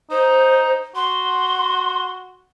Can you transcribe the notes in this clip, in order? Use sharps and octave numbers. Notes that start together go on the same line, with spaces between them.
D#4 C5
F#4 C6